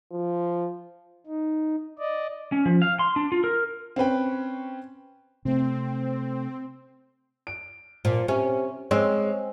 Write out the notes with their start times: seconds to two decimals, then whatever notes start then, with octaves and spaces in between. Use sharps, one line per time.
0.11 F3
1.27 D#4
1.99 D5 D#5
2.52 C#4
2.65 F3
2.82 F5
2.99 C6
3.16 D4
3.32 F4
3.44 A#4
3.96 C4 C#4 B4 G5
5.45 C3 A3 C4
7.47 D7
8.05 A#2 F3
8.28 C3 C#4
8.91 G#3 C4 C#4